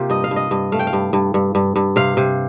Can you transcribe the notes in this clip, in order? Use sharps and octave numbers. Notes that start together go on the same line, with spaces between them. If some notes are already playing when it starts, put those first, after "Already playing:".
Already playing: C3 A#3 F4 G4
G2 D#5
F5
G2
D#5
G2
A3 F5
G5
F5
G2
G2
G2
G2
G2
C3 F5
C3